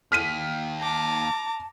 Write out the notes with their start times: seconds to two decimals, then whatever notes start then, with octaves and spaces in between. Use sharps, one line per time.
0.12 D#2 F6 B6 D#7
0.80 A5 A#5 D6